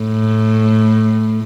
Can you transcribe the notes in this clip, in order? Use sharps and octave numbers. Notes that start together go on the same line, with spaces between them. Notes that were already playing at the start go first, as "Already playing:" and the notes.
Already playing: A2